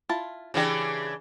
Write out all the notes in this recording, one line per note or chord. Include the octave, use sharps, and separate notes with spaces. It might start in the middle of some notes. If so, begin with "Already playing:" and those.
E4 F4 A5
C#3 E3 D4 G4 G#4